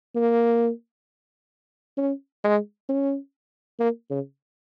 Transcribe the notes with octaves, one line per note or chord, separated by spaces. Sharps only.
A#3
C#4
G#3
C#4
A#3
C#3